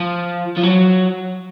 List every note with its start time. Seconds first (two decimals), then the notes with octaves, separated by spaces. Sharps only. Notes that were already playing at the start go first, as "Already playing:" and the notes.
Already playing: F3
0.57 F3
0.63 F#3